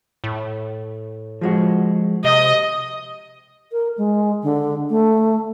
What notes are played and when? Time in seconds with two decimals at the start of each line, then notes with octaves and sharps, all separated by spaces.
0.24 A2
1.41 F3 G#3 F#4
2.24 C3 D#5
3.72 A#4
3.98 G#3
4.43 D3
4.90 A3